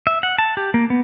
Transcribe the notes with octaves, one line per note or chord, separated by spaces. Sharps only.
E5
F#5
A5
G4
A#3
B3